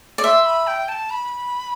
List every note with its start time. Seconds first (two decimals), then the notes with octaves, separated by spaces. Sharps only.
0.18 D5
0.24 E5 C6
0.46 B5
0.67 G5
0.89 A5
1.10 B5